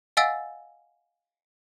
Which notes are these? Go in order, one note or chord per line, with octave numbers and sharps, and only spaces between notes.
D#5 F5 F#5 G#5 E6 A6